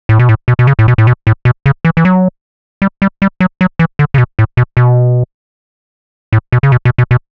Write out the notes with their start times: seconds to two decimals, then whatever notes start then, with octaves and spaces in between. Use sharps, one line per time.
0.09 A2
0.19 B2
0.29 A2
0.48 B2
0.59 B2
0.67 C#3
0.79 A2
0.88 B2
0.98 A2
1.07 B2
1.27 A2
1.45 B2
1.66 C#3
1.85 E3
1.97 E3
2.05 F#3
2.82 G3
3.02 G3
3.22 G3
3.40 F#3
3.61 F#3
3.79 E3
3.99 D3
4.14 C#3
4.18 B2
4.39 A2
4.57 B2
4.77 B2
6.33 A2
6.52 B2
6.63 C#3
6.72 B2
6.85 B2
6.98 B2
7.11 B2